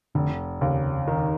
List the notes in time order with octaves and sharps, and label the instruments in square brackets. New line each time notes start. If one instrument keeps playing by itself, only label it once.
[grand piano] F1 [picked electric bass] D3
[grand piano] D#2 [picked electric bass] C#3
[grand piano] D#3